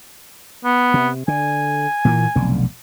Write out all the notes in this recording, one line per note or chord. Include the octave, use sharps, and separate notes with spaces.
B3
C3
D3 G#5
A#2 E3 A#3
F1 B1 D3